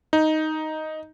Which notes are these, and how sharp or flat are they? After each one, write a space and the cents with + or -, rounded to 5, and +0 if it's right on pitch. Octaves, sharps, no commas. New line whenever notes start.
D#4 +5